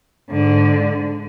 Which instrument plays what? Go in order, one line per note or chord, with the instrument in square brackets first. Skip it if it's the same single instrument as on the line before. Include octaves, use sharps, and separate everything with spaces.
[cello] G#2 D3